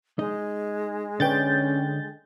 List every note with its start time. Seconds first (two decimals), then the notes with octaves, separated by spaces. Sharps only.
0.19 G#3 D#4 D#5
1.20 D3 C#4 B4 C#5 G5 G6 A6